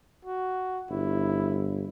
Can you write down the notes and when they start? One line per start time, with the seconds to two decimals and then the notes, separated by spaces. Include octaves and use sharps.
0.25 F#4
0.91 G1 E4